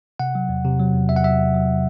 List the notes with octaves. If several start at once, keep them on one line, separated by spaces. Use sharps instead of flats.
C3 F#5
F#3
E2
C3
F#3
E2
E2 E5
F#5
F#3 E5
E2
F#3